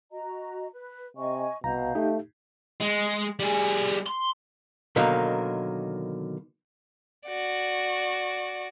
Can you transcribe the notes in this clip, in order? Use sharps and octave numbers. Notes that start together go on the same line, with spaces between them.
F#4 D#5 A#5
B4
C3 D#5 G#5 C#6
C2 B2 F5 A#5 G6
A3 D#4 G4
G#3
G3 G#4
C6
B2 D3 D#3 F#3 A#3
F#4 D5